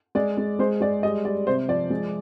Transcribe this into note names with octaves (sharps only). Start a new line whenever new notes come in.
G#3 D5
G#3
G#3 C5
G#3 D5
G3 D#5
G3 D5
C3 C5
F3 D5
G#3